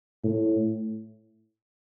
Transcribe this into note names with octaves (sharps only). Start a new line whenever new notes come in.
A2